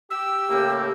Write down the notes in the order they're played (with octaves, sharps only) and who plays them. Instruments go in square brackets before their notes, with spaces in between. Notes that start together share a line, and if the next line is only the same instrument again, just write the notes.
[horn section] G4 [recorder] E6
[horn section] A2 C#3 A#3 [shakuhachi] G4